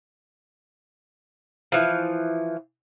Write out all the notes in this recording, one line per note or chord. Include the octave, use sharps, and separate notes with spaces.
E3 F3